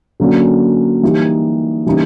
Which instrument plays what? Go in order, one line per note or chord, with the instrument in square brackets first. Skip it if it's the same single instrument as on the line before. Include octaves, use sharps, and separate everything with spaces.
[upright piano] D3 F#3 A#3 C#4
E3 G3 A#3 D#4 G4
C#3 E3 G3 A#3 D#4